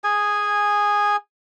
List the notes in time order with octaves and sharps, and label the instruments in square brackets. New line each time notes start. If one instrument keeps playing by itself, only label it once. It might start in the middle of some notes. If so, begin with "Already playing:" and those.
[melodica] G#4 G#5